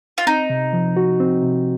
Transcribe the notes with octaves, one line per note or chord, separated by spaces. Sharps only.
F4
C4 D#4
C3
F3
F#4
C4
C3